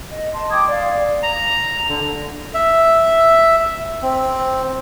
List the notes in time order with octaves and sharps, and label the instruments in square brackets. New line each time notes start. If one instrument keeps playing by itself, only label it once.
[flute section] D#5
D#5 A5 C6
G5 D6 D#6 G#6
D5 F5
[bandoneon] A#5
D3
[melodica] E5
C4